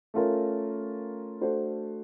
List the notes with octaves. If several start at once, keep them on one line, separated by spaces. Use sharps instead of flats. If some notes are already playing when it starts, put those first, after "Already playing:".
A3 C#4 F4 A#4
A3 D4 F#4 A4 C5